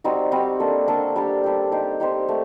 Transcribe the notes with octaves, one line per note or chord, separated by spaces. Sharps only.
G3 C4 D#4 F#4
G3 C4 D#4 F#4
A#3 D4 A4
A#3 D4 A4
G3 D4 G4
G3 D4 G4
D#4 G4 C5
D#4 G4 C5
A3